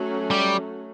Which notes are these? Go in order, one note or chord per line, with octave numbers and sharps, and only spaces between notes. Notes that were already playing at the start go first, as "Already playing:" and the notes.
Already playing: F#3 A3 C#4 F#4
G3